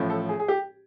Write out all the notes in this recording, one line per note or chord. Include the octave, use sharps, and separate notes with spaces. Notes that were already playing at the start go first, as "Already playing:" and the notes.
Already playing: A1 A2 F3
A4
G#4
G#4
G4